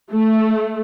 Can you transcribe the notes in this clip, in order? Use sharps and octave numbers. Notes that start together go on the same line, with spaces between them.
A3